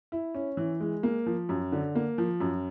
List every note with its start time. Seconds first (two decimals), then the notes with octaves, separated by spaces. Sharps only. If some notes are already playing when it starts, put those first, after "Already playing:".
0.12 E4
0.35 C#4
0.57 E3
0.81 G#3
1.03 A#3
1.26 F3
1.49 F#2
1.72 D3
1.95 A#3
2.18 F3
2.40 F#2